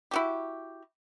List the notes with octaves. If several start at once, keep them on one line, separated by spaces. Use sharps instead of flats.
E4 F#4 G4